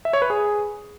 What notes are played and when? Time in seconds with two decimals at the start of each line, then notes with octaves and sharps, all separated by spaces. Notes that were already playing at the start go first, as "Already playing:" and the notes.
0.05 E5
0.13 C#5
0.22 B4
0.30 G#4